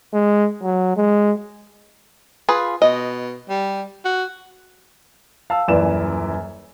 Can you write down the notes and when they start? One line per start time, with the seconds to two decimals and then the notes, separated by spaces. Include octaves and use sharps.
0.13 G#3
0.63 F#3
0.97 G#3
2.49 F4 G#4 B4
2.82 B2 D#5
3.49 G3
4.05 F#4
5.50 F5 A5 E6
5.68 D#1 F#2 E3 D5 G#5 E7